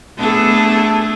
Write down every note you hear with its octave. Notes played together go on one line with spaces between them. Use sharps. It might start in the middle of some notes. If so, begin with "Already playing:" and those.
A3 B3 D4 G#4 A4